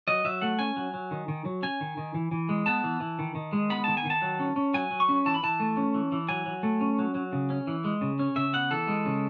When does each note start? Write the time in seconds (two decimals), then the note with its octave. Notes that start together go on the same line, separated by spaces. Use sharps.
0.08 F#3 D#5
0.25 F#3 E5
0.42 A3 F#5
0.59 C#4 G#5
0.77 F#3
0.94 F#3
1.11 D#3
1.28 D#3
1.45 F#3
1.63 C#4 G#5
1.81 D#3
1.97 D#3
2.14 E3
2.31 E3
2.49 G#3
2.66 B3 A5
2.84 E3
3.00 E3
3.19 D#3
3.35 D#3
3.53 G#3
3.70 B3 B5
3.84 D#3 A5
3.97 G#5
4.05 D#3 A5
4.22 F#3
4.39 C#4
4.56 C#4
4.74 F#3 G#5
4.91 F#3
5.00 C#6
5.09 C#4
5.26 E3 A5
5.34 B5
5.43 E3 A5
5.60 A3
5.77 C#4
5.94 E3
6.12 E3
6.29 F#3 G#5
6.46 F#3
6.63 A3
6.81 C#4
6.99 F#3
7.15 F#3
7.33 C#3
7.50 C#4
7.67 E3
7.84 G#3
8.01 C#3
8.19 C#4
8.36 C#3 E5
8.53 B3 F#5
8.71 E3 A4
8.88 G#3
9.05 C#3